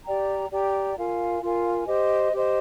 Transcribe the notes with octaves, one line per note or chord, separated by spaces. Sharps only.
G4 D5 G5 A#5
G4 D5 G5 A#5
F4 A#4 F5 G#5
F4 A#4 F5 G#5
G4 C5 D#5
G4 C5 D#5